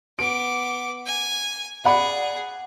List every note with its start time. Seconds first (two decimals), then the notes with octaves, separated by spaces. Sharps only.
0.19 B3 D6 D7
1.06 G#5
1.85 G#4 D5 F#5 B5